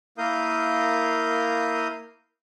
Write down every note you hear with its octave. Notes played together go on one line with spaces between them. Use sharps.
A#3 E4 A#4 F5 D#6 G6